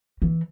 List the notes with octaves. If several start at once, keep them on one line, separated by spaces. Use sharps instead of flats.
E3